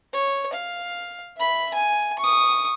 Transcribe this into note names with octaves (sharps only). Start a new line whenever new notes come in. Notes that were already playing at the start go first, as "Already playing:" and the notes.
C#5
F5
E5 B5
G#5
C#6 D#6